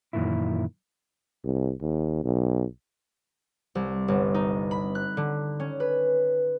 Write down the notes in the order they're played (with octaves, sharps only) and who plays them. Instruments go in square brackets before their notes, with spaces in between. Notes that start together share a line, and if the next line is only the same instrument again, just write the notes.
[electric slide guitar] F#2 A#2 D#3 E3 E4
[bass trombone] C2
D#2
B1
[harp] C2
G1
D#4
B5
F#6
D3
C#4
B4